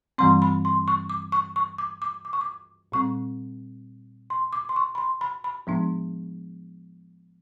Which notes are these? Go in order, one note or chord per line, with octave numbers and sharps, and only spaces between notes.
G2 E3 G3 C4 C6
B5
C6
C#6
D6
C#6
C#6
D6
D6
D6
C#6
D6
A#2 G3 C4 C#6
C6
D6
C6
C#6
B5
C6
B5
B5
A2 F3 G#3 B3 D4